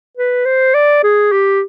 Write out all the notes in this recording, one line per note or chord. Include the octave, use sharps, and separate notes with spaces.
B4
C5
D5
G#4
G4